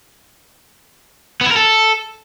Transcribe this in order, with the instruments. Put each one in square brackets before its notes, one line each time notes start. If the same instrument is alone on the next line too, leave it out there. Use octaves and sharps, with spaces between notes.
[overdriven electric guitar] B3
E4
A#4
A4